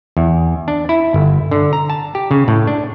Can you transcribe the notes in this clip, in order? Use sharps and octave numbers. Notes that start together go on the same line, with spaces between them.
E2
D4
E4
G1
D3
A#5
A5
G4
C#3
A2
D4